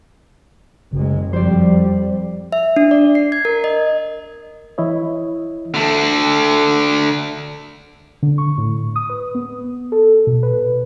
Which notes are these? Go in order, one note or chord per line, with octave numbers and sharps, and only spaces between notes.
F#1 C#3 G#3
F2 F3 G3 C5 D5
E5
D4
D5
C7
G#6
A#4
D#5
E3 E4 C#5 D#5
D3 A3
D3
C#6
A2
D#6
B4
B3
A4
B2
B4